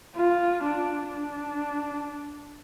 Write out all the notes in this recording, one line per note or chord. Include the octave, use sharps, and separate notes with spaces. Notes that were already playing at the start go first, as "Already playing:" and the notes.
F4
D4
D4